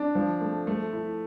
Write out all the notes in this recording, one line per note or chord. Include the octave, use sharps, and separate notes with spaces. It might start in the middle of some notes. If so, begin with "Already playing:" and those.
Already playing: D4
F3
A3
A3
E4